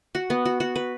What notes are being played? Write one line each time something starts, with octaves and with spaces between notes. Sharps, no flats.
F#4
B3
F#4
F#4
B4